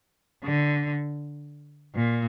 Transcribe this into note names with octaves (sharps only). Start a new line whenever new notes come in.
D3
A#2